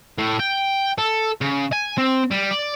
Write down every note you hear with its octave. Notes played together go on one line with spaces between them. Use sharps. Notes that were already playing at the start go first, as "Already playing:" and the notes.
A2
G5
A4
C#3
G#5
C4
G3
D5